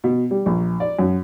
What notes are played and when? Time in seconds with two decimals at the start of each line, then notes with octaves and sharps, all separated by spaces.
0.04 B2
0.31 G3
0.46 A#1
0.80 D5
0.99 F#2